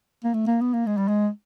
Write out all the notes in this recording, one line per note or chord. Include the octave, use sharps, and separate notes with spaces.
A#3
A3
A#3
B3
A#3
G#3
G3
G#3